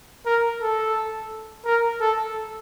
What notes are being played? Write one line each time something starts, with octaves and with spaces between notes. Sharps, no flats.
A#4
A4
A#4
A4